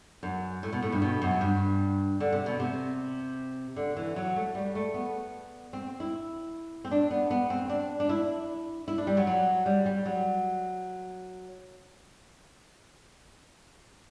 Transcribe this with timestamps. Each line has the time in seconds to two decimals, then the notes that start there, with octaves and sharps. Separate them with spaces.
0.23 F#2
0.63 A2
0.73 B2
0.82 A2
0.92 G2
1.02 B2
1.22 F#2
1.41 G2
2.20 D3
2.32 C3
2.46 B2
2.60 C3
3.76 D3
3.97 E3
4.16 F#3
4.36 A3
4.55 G3
4.75 A3
4.94 B3
5.73 C4
6.00 E4
6.85 C4
6.91 D4
7.11 B3
7.31 B3
7.50 C4
7.69 D4
8.00 D4
8.09 E4
8.88 E4
8.98 D4
9.07 G3
9.17 F#3
9.27 F#3
9.66 G3
9.86 G3
10.06 F#3